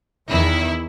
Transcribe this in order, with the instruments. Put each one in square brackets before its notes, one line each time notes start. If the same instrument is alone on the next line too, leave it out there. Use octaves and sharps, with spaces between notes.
[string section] E2 D#3 E4